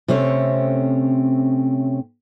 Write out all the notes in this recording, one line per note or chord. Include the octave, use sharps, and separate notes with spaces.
C3 A3 C4 C#4 C#5